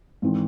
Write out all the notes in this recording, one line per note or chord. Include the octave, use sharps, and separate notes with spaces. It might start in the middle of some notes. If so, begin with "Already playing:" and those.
G#1 E3 C4